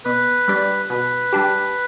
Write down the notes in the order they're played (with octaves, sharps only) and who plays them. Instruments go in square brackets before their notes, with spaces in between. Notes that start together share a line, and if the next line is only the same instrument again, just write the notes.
[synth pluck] B2 [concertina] B4
[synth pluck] G3 D4 G4
[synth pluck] B2 [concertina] B4
[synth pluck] G3 D4 G4